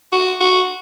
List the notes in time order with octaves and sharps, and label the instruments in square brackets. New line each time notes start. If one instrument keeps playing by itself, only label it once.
[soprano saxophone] F#4
F#4